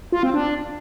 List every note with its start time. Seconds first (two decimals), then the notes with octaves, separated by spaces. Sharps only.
0.12 F4
0.23 C4
0.34 D4